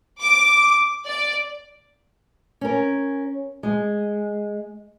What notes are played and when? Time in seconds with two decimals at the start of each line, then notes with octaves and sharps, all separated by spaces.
0.21 D6
1.06 D5
2.61 C#4 A#4
3.63 G#3